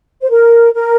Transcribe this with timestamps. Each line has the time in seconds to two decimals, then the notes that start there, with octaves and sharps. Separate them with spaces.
0.21 C5
0.29 A#4
0.74 A#4